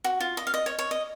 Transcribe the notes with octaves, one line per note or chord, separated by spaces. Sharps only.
F#4
F4
D#5
F5
D#5
C#5
C#5
D#5